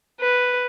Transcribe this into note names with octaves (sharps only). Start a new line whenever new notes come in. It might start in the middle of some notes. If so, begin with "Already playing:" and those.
B4